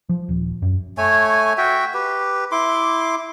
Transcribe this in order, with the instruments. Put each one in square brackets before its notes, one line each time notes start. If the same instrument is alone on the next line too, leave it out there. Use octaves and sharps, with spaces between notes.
[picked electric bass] F3
D#1
F#2
[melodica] A3 C#5 G#5
F#4 E5 G5
G4 B4
E4 C6 D6